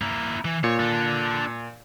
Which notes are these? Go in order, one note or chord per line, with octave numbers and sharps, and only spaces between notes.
A#3 E4
E3
A#2 C#5
D4 A4